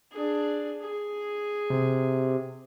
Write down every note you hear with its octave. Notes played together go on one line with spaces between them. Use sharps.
D4 G#4
G#4
C3